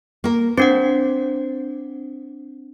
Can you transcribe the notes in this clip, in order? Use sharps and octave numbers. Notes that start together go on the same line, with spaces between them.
A#3 A#4
C4 D4 C5 F#5